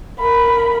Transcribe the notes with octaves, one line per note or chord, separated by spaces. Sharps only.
A#4 B5